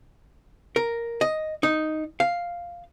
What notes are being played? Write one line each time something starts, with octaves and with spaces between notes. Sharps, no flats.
A#4
D#5
D#4
F5